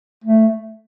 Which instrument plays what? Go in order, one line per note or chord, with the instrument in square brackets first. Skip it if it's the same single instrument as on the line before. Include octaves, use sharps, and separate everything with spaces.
[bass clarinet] A3